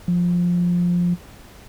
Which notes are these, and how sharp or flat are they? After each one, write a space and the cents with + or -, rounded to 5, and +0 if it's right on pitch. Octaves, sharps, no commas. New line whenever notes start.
F3 +10